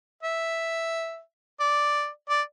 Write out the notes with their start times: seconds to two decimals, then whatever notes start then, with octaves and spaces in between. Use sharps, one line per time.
0.23 E5
1.60 D5
2.29 D5